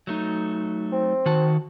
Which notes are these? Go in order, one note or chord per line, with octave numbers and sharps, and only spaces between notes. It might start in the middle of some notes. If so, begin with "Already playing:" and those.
F#3 A3 D#4
C4
D#3 F#4 A5